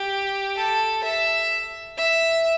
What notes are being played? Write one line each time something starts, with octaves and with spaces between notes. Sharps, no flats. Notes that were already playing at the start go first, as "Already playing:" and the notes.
Already playing: G4
A4
E5
E5